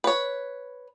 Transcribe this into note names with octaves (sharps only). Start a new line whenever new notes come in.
B4 C#5